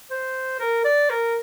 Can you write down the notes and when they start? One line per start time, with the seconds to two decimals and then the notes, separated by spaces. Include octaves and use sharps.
0.11 C5
0.59 A#4
0.85 D5
1.10 A#4